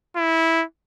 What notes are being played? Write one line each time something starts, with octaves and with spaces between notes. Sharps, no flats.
E4